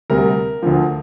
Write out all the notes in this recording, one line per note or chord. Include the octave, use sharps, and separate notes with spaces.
D2 C3 G3 A#4
D2 D3 F3